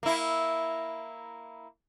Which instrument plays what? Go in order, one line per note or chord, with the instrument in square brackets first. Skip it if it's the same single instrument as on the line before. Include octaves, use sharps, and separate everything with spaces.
[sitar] A#3 E4